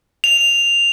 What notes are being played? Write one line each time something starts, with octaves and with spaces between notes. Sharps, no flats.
F7